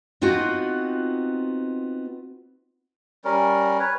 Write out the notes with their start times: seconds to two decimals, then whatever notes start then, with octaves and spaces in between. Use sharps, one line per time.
0.21 B3 C4 D#4 F4 F#4
3.25 G3 C#4 A#4
3.79 B4 C#5